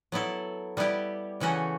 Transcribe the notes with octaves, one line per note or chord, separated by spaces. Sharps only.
F#3 B3 E4 A4
G3 B3 E4 G4
C#3 E3 A3 C#4 F#4